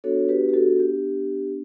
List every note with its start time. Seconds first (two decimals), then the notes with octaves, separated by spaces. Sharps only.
0.04 B3 D4 F#4 A4 C#5
0.29 G4 B4
0.49 G4
0.53 F#4 A4
0.79 G4